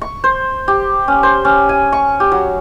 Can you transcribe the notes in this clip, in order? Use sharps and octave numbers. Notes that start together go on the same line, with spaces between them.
C#6
C5
G4
C#4
C5
C#4
G#5
C#6
G4
F#3